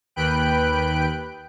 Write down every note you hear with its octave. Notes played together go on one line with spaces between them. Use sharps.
D#2 B4 G5 F#6 D7